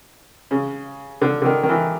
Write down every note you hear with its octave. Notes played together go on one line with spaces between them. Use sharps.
C#3
D3
D3
D#3
D#3
E3